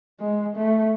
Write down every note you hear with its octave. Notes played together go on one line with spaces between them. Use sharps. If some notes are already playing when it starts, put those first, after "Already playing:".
G#3
A3